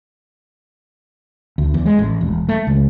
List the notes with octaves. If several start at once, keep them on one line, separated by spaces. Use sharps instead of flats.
D2
E2
G#3
A1
E1
A3
C#2